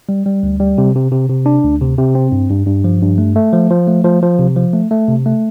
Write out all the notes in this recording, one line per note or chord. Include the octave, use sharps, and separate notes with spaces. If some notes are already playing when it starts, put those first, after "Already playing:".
G3
G3
D2
G3
C3
C3
C3
C3
D4
D2
C3
C3
C4
G2
G2
G2
F3
G2
A3
A3
F3
F3
A3
F3
F3
C3
F3
A3
A3
C3
A3